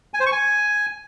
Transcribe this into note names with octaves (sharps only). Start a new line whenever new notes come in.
G#5
C5
C#6
G#5